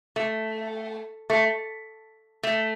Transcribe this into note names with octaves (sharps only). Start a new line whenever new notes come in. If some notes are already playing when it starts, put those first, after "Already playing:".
A3
A3
A3